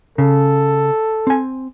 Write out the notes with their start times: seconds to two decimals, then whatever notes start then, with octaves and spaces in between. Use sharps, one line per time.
0.18 C#3 A4
1.27 C4 G#5